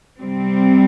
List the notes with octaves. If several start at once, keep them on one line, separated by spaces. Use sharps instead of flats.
C3 G3 C4